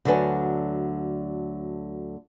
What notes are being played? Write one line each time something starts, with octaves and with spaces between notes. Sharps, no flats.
D2 D3 F#3 A4 B4 G#5